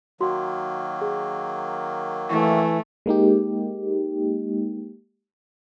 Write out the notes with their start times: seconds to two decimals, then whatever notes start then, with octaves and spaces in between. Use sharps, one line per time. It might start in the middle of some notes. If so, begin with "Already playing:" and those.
0.21 D#3 F#3 A#3 F#4 C6
1.01 G#4
2.30 E3 A3 E4 C#6
3.06 G#3 A#3 D#4 G4